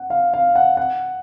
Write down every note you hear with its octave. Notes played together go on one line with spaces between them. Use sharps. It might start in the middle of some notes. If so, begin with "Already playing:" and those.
Already playing: F#5
F5
F5
F#5
F#5